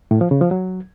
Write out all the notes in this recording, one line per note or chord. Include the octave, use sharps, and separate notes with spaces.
A2
F3
C#3
F3
F#3